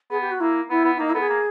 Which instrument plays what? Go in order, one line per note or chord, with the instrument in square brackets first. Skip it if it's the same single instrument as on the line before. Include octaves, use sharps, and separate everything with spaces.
[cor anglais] B3 [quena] G#4
[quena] G4
F#4
[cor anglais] A#3 [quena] E4
[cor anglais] B3 [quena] E4
[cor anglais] B3
[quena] E4
[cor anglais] A#3 [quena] D#4
[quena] E4
[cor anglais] B3 [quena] A4
[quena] G#4
[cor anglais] A#3